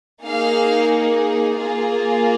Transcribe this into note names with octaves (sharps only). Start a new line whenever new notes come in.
A#3 D#4 G#4 F5
A#3 F4 G#4